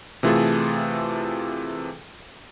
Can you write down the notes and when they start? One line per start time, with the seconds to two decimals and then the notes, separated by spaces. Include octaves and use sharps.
0.23 C3 E3 A3 F4 G#4 A4